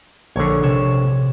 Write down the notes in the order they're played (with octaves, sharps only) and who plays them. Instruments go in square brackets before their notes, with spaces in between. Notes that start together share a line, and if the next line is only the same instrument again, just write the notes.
[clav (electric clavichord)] A#1 D3 [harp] C#5 C#6
[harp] C3 C#5 E7